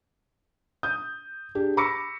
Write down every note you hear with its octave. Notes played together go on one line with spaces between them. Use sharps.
D#6 G6
D4 G4 G#4
B5 C#6 D6 E6 A#6 C#7